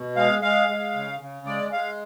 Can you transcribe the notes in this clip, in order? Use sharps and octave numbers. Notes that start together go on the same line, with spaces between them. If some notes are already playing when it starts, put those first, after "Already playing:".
Already playing: B2
G#3 F5
G#3 F5
G#3
C#3
C#3
G#3 D5
G#3 F5